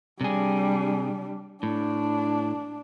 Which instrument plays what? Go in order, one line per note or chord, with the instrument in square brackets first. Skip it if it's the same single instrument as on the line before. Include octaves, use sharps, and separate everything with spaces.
[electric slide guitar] C3 G#4 [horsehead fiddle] G3 D4
[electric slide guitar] A2 [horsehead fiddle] D4